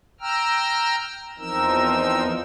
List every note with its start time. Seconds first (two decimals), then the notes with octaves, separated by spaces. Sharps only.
0.20 G5 A#5 E6 F6
1.38 E2 F3 C4 D#4 A#4 E6